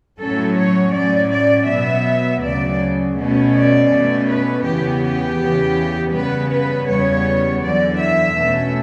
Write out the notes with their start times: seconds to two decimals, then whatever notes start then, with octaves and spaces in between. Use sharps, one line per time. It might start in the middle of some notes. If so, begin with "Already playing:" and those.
0.20 A2 F#3 C#4 A4
0.57 C#5
0.93 A2 F#3 C#4 D5
1.31 D5
1.67 B2 F#3 B3 E5
2.42 D2 C#3 F#3 D5
3.17 B2 A3 C#4
3.54 D5
3.91 B2 A3 C#4
4.28 B4
4.65 E2 C#3 E3 B3 G4
5.02 G4
5.40 E2 C#3 E3 B3
6.13 C#3 G3 B3 B4
6.50 B4
6.87 E2 C#3 G3 B3 C#5
7.62 E2 D3 F#3 D5
7.99 E5
8.36 B2 A3 C#4